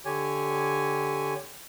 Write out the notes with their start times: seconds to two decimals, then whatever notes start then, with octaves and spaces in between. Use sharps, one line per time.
0.05 D3 G4 C#5 G#5